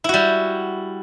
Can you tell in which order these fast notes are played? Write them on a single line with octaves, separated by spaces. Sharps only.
E4 F#4 G3